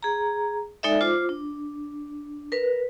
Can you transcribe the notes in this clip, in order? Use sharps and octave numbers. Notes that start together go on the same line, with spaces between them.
G#4 A#5
G#3 D#4 A4 D5 E5
F4 C5 D6
D4
A#4 B4